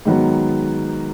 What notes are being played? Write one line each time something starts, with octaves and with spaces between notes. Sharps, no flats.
G#2 D#3 F#3 B3